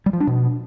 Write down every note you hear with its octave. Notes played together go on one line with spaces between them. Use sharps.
G3
F3
D4
B2